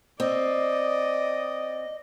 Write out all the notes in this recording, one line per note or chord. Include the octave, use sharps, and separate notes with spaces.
C4 D5 D#5